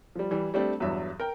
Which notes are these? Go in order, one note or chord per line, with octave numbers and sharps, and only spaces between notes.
F3 G3
E3 G3
G3 A3 C4 D4 G4
E2 G2 F#3 E5
A#4 G5